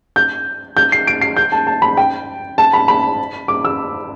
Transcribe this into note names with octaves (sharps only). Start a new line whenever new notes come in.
G6
G6
C7
D7
C7
G6
A5
A5
B5
G5
A5
B5
B5
D6
E6